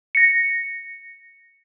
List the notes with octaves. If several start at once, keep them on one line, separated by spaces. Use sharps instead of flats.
A#6 C#7